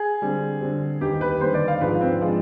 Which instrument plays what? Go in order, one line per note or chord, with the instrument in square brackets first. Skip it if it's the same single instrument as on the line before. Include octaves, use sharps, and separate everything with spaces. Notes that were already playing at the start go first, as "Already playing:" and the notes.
Already playing: [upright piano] G#4
[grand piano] D3 G3 C4
D3 G3 C4
[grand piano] D#2 D3 G3 B3 D#4 [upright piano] G4
[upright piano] B4
[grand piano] D#2 D3 G3 B3 D#4 [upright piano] C5
[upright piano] D5
F5
[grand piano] G#2 F3 G#3 D4 F4 [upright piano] B4
[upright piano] C4
[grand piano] F3 G#3 D4 F4